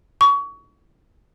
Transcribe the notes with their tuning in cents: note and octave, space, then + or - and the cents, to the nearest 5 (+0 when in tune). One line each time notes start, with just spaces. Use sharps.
C#6 +25